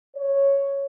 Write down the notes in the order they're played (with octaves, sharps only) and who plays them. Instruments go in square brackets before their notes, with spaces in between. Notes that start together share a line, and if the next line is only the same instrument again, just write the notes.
[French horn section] C#5